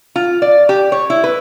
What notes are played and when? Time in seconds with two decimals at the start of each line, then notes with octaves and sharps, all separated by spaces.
0.16 F4
0.42 D5
0.69 G4
0.92 C#5
1.10 E4
1.24 B4